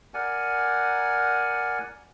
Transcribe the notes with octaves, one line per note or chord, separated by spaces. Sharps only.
A#4 D5 F#5 G#5